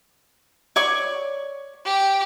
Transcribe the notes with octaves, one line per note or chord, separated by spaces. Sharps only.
C#5 D5 C#6
G4